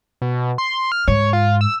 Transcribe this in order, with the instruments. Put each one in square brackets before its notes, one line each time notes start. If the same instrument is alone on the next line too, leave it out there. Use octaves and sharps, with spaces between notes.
[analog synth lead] B2
C6
F6
[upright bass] G#2 [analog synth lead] C#5
[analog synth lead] F4
E6